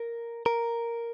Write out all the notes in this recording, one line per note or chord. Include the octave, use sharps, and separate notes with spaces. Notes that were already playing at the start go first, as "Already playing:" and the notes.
Already playing: A#4
A#4